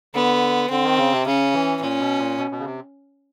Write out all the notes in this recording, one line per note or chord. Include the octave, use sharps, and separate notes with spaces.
D3 B3
D3 C4
D#3
C#3
C3
C#3 C#4
E3
A#2 C#4
B2
A#2
B2
B2
C#3
C3